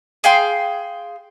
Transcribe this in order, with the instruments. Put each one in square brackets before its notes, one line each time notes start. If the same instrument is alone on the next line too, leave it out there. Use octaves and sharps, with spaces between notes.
[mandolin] G#4 F5 G5 C6